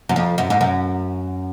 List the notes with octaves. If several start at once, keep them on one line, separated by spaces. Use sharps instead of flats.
F#2
F2
F#2
G#2
F#2